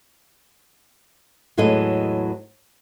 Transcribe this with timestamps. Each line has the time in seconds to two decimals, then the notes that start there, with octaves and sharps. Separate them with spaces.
1.57 E2 A2 F#3 G#3 A4 D#5